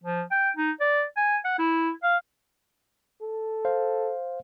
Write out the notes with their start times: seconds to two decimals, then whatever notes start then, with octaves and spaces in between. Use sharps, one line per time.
0.03 F3
0.31 G5
0.57 D#4
0.80 D5
1.17 G#5
1.45 F#5
1.59 E4
2.03 F5
3.21 A4
3.65 C5 F5